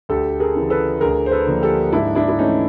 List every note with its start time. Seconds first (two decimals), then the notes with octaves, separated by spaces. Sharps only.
0.09 D2 G4 A4
0.40 G#4 A#4
0.55 C#3 E3
0.70 A4 B4
1.01 D2 G#4 A#4
1.26 C5
1.31 A4 B4
1.47 D3 F3 A#3
1.62 G4 A4
1.92 G#2 D4 E4
2.15 D4 E4
2.29 E4
2.39 E3 A3 C#4 D#4